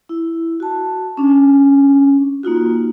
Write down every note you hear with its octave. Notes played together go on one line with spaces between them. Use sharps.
E4
F#4 A5
C#4 D4
A#3 D#4 F4 F#4